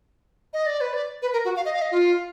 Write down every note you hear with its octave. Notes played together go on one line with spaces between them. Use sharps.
D#5
D5
B4
D5
B4
A#4
F#4
F5
D#5
F5
D#5
F4